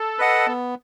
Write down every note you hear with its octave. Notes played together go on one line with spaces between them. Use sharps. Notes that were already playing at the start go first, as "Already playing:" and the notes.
Already playing: A4
B4 D#5 F#5
B3